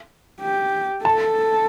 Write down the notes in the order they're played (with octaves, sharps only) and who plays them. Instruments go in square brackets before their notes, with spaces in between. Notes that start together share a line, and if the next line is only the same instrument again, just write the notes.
[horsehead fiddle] G4
[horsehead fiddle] A4 [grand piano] A5